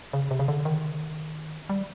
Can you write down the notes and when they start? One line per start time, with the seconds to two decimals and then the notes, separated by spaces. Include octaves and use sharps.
0.13 C#3
0.31 C3
0.39 C#3
0.48 D3
0.65 D#3
1.69 G3